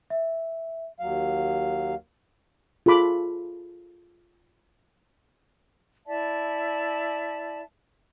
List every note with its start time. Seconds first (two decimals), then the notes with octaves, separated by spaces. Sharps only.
0.10 E5
0.99 D#2 F#3 F5
2.86 F4 G#4 A4 B5 D6
6.06 E4 D5 E5 A5